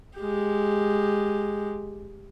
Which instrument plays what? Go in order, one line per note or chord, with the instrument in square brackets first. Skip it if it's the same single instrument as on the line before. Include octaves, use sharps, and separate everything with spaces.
[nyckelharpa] G#3 G4